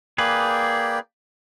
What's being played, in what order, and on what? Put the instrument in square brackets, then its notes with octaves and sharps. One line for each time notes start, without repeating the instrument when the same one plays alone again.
[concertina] A#3 D5 G5 [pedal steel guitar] G#4 B4